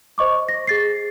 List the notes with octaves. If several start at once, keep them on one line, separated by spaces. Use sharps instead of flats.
C5 D#5 C#6 D6
A#6
G#4 A6 C7